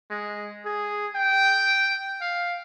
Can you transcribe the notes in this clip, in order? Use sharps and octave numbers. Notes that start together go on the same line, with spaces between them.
G#3
G#4
G5
F5